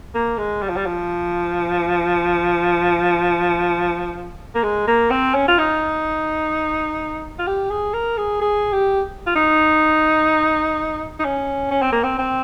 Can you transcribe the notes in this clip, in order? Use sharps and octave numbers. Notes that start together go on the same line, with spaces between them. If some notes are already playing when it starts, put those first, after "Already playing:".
A#3
G#3
G3
F3
G3
F3
A#3
G#3
A#3
C4
C#4
F4
D#4
F4
G4
G#4
A#4
G#4
G#4
G4
F4
D#4
D#4
C#4
C#4
C4
A#3
C4
C4